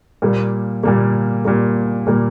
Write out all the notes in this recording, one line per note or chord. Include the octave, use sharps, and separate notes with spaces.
A#2 G3 A#3
A#2 G3 A#3
A#2 G3 A#3
A#2 G3 A#3